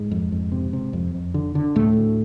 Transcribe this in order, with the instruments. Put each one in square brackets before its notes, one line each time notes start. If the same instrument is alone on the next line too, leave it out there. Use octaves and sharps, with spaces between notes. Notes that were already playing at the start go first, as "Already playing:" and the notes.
Already playing: [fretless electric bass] G#2 G#3
F2
F2
C3
C3
F2
F2
D3
D3
D2 A2 A3
D2